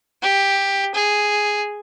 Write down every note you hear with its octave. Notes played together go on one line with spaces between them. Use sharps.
G4
G#4